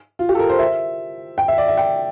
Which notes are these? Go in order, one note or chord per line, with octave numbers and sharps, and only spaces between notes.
F4
G4
A4
A#4
C5
E5
G5
E5
D5
E5
G5